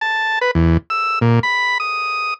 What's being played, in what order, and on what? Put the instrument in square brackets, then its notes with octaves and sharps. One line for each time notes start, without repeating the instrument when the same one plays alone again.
[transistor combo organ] A5
B4
E2
E6
A#2
B5
D#6